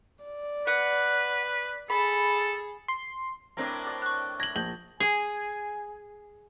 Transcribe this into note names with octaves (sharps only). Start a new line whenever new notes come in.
D5
B4 F#5
G#4 A4 B5
C6
A2 C4 D4 A#4 B4
D5 D6
C#6 F#6
G#6 A#6 F#7
A#1 G6 F#7
G#4 G#5